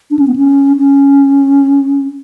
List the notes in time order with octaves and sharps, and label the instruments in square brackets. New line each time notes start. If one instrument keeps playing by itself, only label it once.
[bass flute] D4
C#4
B3
C#4
C#4